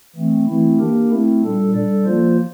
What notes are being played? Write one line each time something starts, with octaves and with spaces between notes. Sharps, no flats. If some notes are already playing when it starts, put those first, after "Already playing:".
E3 A3 C4
E3 A3 C4 E4
A#3 D4 G4 A#4
A3 C4 E4
A#2 G3 D4 A4
G3 D4 A4 D5
F3 A#3 F4 C5